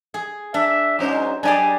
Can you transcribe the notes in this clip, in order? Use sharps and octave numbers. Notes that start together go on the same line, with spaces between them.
G#4
D4 E5
G#2 F#3 C#4 C5
F#2 D4 D#4 G4 G#4 D5 G#5